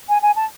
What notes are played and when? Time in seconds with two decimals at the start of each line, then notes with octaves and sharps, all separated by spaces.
0.09 G#5
0.22 G#5
0.36 A5